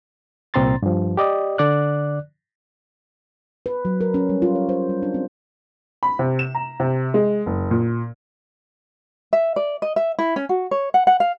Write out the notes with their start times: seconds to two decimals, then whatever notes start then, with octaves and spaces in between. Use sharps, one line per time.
0.54 C2 A#2 C4 A#5 C6 A6
0.82 G2 F3
1.17 G4 D5 D#5
1.58 D3 D5 F#6
3.66 B4
3.85 F#3
4.01 A#4
4.14 C#4
4.29 G3
4.42 F4
4.55 C#5
4.69 C5
4.89 G3
5.03 D4
5.14 C4
6.03 B5
6.19 C3
6.39 E7
6.55 A#5
6.80 C3
7.14 G#3
7.46 F#1
7.71 A#2
9.33 E5
9.56 D5
9.82 D#5
9.96 E5
10.19 E4
10.36 C#4
10.49 F#4
10.71 C#5
10.94 F#5
11.07 F#5
11.20 F5